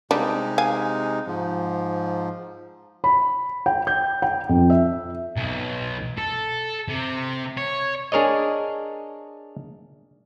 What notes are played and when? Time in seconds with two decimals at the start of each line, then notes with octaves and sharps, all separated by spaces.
0.11 C3 G3 G#3 D4 D#4
0.58 F5 G#5
1.27 G#2 F3
3.04 B5
3.66 G5
3.87 G6
4.22 G5
4.49 F2
4.70 E5
5.36 B1
6.18 A4
6.89 C3
7.57 C#5
8.12 D4 G#4 A#4 C#5 D#5